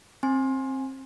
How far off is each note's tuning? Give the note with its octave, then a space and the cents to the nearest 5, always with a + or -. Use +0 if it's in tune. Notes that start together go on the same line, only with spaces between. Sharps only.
C4 +20 G#5 +0 C6 +25